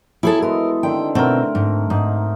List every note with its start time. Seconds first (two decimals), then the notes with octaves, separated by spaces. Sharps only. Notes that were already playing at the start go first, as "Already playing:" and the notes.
0.23 E3 F#3 B3 E4 G#4 A4
0.42 G#3 B3 A4 A#4
0.83 D3 D#3 C4 G5
1.15 B2 A3 C4 A#4
1.55 G#2
1.90 G#2 D#4